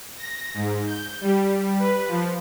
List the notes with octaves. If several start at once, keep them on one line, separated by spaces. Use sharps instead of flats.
A#6
G#2
G6
G3
B4
F3